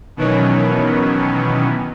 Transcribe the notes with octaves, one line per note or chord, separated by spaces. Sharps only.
B2 D#3 E3 F#3 B3 C#4